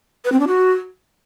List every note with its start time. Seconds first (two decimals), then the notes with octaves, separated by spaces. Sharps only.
0.25 B4
0.32 C4
0.40 D4
0.47 F#4